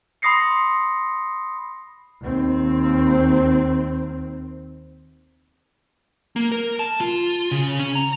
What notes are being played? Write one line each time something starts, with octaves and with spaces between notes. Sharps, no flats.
B5 C6 D#6 A#6 C7 C#7
D#2 C4
A#3
A#4
A5
F4
C#3
C#4
A#5